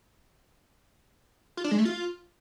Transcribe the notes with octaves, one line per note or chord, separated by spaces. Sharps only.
F4
D4
G#3
A3
F4